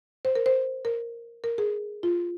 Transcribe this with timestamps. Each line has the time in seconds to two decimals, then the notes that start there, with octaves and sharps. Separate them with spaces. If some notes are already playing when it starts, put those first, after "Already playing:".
0.25 C5
0.36 A#4
0.46 C5
0.85 A#4
1.44 A#4
1.58 G#4
2.03 F4